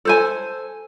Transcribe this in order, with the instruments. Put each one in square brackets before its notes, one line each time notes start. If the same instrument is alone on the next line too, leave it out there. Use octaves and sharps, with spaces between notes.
[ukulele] A4 C5 G#5